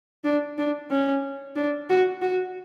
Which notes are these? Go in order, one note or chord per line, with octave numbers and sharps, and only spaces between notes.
D4
D4
C#4
D4
F#4
F#4